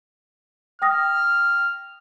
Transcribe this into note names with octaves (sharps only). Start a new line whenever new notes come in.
G5 D#6 F6 A#6